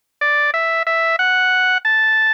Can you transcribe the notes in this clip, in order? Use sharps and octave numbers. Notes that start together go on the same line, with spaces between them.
D5
E5
E5
F#5
A5